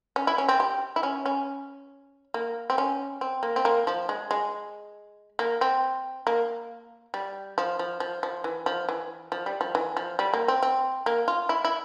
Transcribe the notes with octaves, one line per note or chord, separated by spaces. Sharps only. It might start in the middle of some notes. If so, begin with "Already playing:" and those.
C#4
E4
C#4
C4
G4
E4
C#4
C#4
A#3
C4
C#4
C4
A#3
C4
A#3
F3
G#3
G#3
A#3
C4
A#3
G3
F3
F3
F3
F3
E3
F3
E3
F3
G3
F3
E3
F3
G3
A#3
C4
C4
A#3
F4
E4
E4